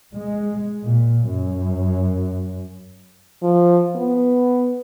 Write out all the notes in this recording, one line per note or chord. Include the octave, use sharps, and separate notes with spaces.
G#3
A#2
F#2
F3
B3